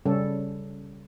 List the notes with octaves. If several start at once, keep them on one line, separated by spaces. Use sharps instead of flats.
C#3 G3 C#4 A4